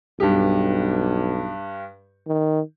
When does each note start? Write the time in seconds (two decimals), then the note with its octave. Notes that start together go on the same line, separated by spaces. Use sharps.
0.20 B1 G2 G4
2.27 D#3